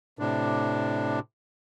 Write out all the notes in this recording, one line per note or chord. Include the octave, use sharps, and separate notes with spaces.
A2 C3 D4